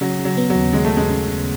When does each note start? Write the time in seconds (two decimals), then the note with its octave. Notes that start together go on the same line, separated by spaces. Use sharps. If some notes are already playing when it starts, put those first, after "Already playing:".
0.01 C#3 F#3
0.19 C#3
0.25 F#3
0.37 B3
0.50 F#3
0.55 D#2
0.73 D#2 G#3
0.85 A3
0.92 D#2
0.97 G#3
1.10 C#3
1.28 C#3